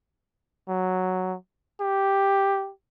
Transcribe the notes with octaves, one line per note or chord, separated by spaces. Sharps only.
F#3
G4